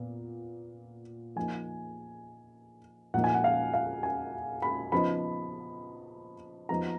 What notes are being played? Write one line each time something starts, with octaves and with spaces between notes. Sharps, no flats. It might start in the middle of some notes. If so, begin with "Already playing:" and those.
Already playing: A#2 B3
F3 A#3 D#4 G#5
A#2 F3 A#3 D#4 F#5
G#5
F#5
F5
F5
G#5
B5
C#3 F3 B3 D#4 B5
F3 B3 D#4 A#5